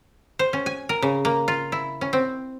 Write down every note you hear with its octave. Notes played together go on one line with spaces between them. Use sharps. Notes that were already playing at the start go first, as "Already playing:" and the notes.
C5
C#4
G#5
A#4
C#3
A#3
F4
E4
C#4
C4